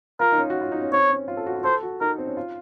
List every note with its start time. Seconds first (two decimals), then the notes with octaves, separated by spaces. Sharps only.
0.20 F4 A#4
0.32 D#4
0.38 C#4
0.50 F#4
0.61 F4
0.72 D#4
0.82 C#4
0.92 C4 C#5
1.11 C#4
1.28 F4
1.37 A4
1.46 F#4
1.56 F4
1.64 A4 C5
1.83 F#4
2.01 D#4 A#4
2.18 C4
2.27 C#4
2.37 F4